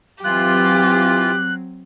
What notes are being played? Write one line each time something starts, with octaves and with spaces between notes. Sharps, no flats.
E3 F#3 C4 F4 G4 F#6